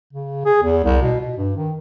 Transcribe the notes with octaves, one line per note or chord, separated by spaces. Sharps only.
C#3
G#4
E2
C2
B2
B2
G2
D#3